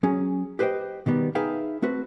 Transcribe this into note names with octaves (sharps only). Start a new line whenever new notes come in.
F#3 C#4 G#4
G4 B4 C5 D#5 G5
B2 D#3 G3 B3
D#4 G#4 B4 E5 F5 G5
A3 C4 F#4 B4